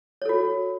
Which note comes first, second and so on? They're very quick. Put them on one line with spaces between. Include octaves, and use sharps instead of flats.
C#5 A4 F#4